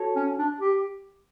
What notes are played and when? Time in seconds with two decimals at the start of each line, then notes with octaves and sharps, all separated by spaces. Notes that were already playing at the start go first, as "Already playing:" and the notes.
Already playing: F#4 A4 C#5
0.16 C#4
0.38 D4
0.61 G4